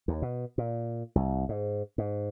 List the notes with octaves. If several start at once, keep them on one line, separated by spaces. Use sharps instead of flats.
D#2
B2
A#2
C2
G#2
G#2